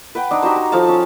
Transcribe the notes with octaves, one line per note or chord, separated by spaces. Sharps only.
B4 F#5 G5
D4 D#4
D#4 F#4 G4 C5
A#5
F3 A4 F5 A5
C#4